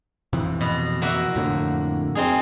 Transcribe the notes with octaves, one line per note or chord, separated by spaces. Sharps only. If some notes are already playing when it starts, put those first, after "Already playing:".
F2 C3 E3
B2
A#3 F#4 E5
F2 A2 D3
C4 D#4 G#4